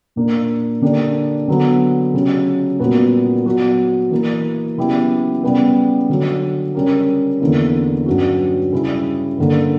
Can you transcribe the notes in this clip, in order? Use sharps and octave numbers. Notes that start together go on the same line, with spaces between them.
A#2 A#3 D4
D3 A#3 D4 G4
D3 F#3 B3
C#3 F#3 C#4 G4
A#2 G3 B3 F#4 A#4
F#3 B3 F#4
E3 A#3 E4
C#3 F#3 B3 E4 G4
C#3 G3 B3
D3 F#3 C#4
C#3 G3 C#4 G4 A#4
E2 D3 A#3 E4
G2 F#3 C#4 F#4
C#3 G3 C#4 E4
G2 D3 A#3